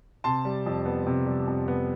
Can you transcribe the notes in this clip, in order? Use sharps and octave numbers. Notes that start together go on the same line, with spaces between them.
C3 A5 C6
G3
F2
B3
C3
G3
F2
B3